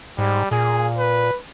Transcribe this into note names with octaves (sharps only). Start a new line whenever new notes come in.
G#2 G3
A#2 G#4
B4